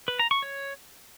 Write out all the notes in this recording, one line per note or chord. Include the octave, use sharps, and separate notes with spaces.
B4
A#5
C#6
C#5